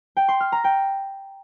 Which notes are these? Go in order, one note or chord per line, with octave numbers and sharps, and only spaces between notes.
G5
C6
F6
A#5
G5